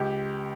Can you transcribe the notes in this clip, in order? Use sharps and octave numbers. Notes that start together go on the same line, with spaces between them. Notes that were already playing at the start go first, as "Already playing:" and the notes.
Already playing: C#2 G4